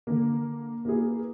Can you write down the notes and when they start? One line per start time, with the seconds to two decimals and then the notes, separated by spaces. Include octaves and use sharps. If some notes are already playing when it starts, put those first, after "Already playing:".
0.07 D3 A#3
0.85 A#3 B3 E4 F#4 G#4